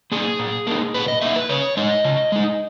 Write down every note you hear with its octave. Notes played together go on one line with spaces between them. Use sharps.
A#3 D#4 G#4
A#2
A#3 D#4
A#2 B4
D#5
A#3 D#4 E5
B4
C#3 C#5
G#3 D#4 D#5
C#3
G#3 D#4